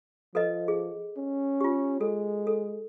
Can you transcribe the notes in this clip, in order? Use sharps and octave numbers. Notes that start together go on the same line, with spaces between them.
F3 A4 B4 D#5
G#4
C#4
F4 G4
G#3 A4
A4